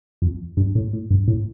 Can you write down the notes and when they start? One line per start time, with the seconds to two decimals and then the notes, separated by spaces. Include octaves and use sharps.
0.22 F2
0.57 G2
0.75 A2
0.93 A2
1.10 G2
1.28 A2